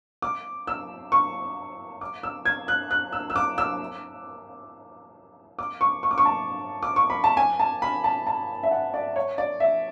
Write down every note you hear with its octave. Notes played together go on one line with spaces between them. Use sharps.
D6
E6
C#6
D6
E6
G#6
F#6
F#6
E6
E6
D6
E6
D6
C#6
C#6
D6
C#6
A5
D6
C#6
B5
A5
G#5
A5
B5
A5
A5
E5
F#5
D5
C#5
D5
E5